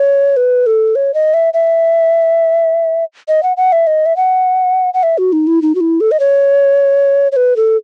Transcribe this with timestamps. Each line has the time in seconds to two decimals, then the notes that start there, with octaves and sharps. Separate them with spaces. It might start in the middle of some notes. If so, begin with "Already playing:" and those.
Already playing: C#5
0.37 B4
0.66 A4
0.95 C#5
1.14 D#5
1.34 E5
1.54 E5
3.28 D#5
3.43 F#5
3.57 F#5
3.72 E5
3.87 D#5
4.06 E5
4.16 F#5
4.94 F#5
5.03 E5
5.18 F#4
5.33 D#4
5.47 E4
5.62 D#4
5.75 F#4
5.81 E4
6.01 A4
6.11 D#5
6.20 C#5
7.32 C#5
7.36 B4
7.56 A4